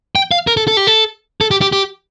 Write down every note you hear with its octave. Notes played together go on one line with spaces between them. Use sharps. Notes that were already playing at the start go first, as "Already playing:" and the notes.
G5
F5
A#4
A4
A4
G4
A4
A4
G4
G4
G4